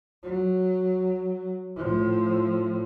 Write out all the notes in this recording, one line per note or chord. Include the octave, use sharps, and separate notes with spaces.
F#3
A2 F3